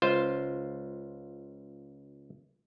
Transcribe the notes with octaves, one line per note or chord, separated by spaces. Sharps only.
C#2 F4 C5